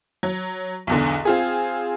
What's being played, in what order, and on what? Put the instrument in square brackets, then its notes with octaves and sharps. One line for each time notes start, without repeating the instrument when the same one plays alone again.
[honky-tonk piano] F#3
B1 E2 D3
C4 F4 G#4